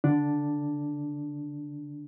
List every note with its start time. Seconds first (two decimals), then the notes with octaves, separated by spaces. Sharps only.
0.04 D3 D4